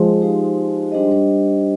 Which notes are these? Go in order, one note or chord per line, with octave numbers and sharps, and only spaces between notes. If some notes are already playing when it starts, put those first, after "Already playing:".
Already playing: F3 G#3
D#4 G4 C5 F5
G3 D4 G4 C5 D#5